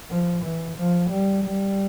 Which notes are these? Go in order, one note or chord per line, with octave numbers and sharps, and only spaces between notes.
F3
E3
F3
G3
G3